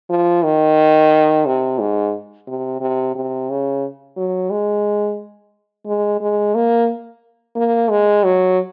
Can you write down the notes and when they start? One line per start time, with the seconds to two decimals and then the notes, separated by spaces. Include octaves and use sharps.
0.10 F3
0.43 D#3
1.46 C3
1.79 G#2
2.48 C3
2.81 C3
3.15 C3
3.50 C#3
4.17 F#3
4.50 G#3
5.87 G#3
6.21 G#3
6.55 A#3
7.56 A#3
7.90 G#3
8.24 F#3